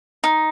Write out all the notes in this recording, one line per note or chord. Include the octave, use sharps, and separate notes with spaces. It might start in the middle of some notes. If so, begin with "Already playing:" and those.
D#4